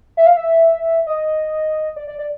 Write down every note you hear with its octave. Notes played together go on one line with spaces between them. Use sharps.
E5
F5
E5
D#5
D5
D5
D5